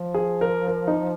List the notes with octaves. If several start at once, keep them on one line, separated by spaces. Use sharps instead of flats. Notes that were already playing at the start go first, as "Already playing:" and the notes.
Already playing: F3
G#4
A#4
A#4
D#4